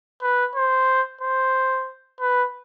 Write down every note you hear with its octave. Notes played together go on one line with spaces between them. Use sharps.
B4
C5
C5
B4